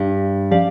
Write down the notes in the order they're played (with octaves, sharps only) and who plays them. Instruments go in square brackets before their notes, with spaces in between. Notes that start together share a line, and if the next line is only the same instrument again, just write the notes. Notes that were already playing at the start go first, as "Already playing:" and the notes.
Already playing: [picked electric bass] G2
[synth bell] F3 C#4 G4 D5 F5